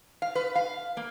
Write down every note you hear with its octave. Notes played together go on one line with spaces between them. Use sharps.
F5
B4
F5
A#3